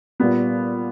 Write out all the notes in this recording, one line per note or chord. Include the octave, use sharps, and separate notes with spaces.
A#2 G3 B3